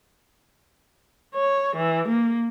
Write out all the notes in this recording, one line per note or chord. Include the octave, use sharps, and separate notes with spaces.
C#5
E3
A#3